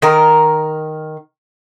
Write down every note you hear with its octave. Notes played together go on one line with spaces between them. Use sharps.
D#3 A#4